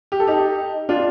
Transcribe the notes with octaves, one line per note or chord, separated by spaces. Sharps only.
G4
A4
D#4 G4
D4 F4